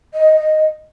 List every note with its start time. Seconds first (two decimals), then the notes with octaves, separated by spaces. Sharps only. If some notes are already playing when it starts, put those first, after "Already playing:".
0.14 D#5
0.36 D#5